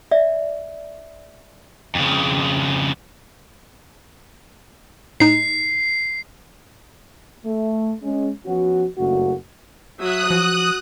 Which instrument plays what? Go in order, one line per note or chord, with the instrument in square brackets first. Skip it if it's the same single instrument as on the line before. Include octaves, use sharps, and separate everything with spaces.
[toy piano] D5 E5
[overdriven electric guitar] F2 C#3
[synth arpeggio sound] A2 D#4 [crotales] C7
[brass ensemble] A3
G#3 C#4
F3 B3 C#4 F#4
F#1 G2 C#3 A3 A#3 F#4
[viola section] F#3 E5 [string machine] D#6 F#6
[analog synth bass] F3 [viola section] F#4